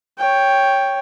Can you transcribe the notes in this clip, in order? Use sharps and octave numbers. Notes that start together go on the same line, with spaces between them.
C#5 G5